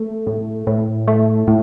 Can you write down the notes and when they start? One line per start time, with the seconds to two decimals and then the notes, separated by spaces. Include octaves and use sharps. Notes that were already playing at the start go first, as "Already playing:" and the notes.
Already playing: A3
0.27 A2
0.67 A2
1.08 A3
1.48 A2